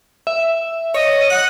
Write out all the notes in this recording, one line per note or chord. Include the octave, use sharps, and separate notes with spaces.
E5
C#5 D#5
F#5 F#6